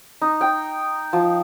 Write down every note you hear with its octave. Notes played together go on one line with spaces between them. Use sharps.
D#4
G5
F3